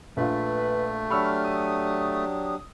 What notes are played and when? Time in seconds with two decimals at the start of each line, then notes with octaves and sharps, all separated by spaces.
0.17 A#1 A3 F4 B4
1.11 F#3 D4 G4 B5 C#6 E6 F6
1.44 D#6